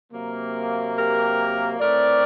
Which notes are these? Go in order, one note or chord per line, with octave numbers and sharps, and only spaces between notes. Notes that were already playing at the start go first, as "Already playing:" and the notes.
C3 F#3 A#3
G4 A#4
A2 A3 C4 A#4 D5